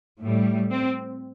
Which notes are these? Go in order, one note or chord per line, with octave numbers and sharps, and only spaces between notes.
A2 G3
C4